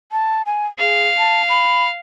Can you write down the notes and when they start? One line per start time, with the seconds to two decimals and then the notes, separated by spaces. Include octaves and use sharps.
0.12 A5
0.46 G#5
0.79 G#4 F5
1.18 A5
1.49 B5